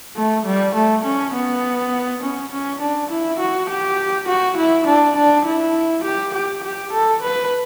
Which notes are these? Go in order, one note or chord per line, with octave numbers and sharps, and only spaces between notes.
A3
G3
A3
C#4
B3
C#4
C#4
D4
E4
F#4
G4
F#4
E4
D4
D4
E4
G4
G4
G4
A4
B4